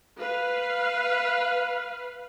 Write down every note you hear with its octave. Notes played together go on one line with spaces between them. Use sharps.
B4 F5